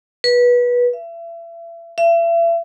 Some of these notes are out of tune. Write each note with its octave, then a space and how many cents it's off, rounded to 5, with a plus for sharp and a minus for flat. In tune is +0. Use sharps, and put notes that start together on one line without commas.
B4 -20
E5 +35
E5 +40